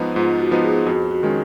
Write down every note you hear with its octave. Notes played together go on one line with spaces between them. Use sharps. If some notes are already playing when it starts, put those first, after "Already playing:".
Already playing: G#2 F3 B3 D#4
G#2 F4
F#4
F3 B3 D#4
G#4
F2 F#4
F#4
D#3 G#3 C#4